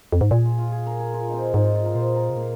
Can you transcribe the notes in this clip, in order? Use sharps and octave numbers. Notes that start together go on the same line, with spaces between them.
F2
G#2
A#2 G#4
F4
F4
G#4
A#4
G#4
F4
C4 D#4
G#2 D#4
F4
F4
A#4
A#2 C5
A#4
C3
A#2 A#3